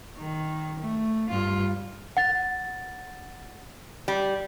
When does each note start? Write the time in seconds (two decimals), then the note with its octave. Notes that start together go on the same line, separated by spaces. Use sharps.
0.17 D#3
0.80 A3
1.30 G2 F4
2.17 F#5 A6
4.08 G3